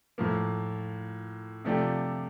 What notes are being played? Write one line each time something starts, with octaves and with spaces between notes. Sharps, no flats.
A2 F3 A#3
C3 F3 A3 D4 G4